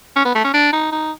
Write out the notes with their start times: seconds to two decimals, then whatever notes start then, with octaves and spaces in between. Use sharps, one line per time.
0.16 C#4
0.25 B3
0.35 A3
0.44 C#4
0.54 D4
0.73 D#4
0.92 D#4